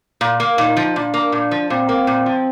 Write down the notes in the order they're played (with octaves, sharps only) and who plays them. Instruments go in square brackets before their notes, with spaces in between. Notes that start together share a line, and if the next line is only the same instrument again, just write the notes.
[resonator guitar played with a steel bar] A#2
A#3
[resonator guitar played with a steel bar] A#2 [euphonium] D#4
[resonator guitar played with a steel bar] F3
[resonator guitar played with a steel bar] A#2 [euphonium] D4
[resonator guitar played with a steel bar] A#3
A#2
F3
[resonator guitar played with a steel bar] A#2 [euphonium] C4
[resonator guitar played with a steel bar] A#3
A#2
F3